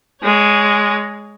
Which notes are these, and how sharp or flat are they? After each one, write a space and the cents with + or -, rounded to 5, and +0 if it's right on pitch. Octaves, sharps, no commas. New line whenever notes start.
G#3 +0 C#5 +25